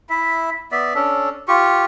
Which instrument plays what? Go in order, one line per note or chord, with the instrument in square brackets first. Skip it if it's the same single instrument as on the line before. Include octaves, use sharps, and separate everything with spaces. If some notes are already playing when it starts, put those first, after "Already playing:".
[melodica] E4 E5
B3 D5 E5
C#4 D4 A4
F4 G4 C#6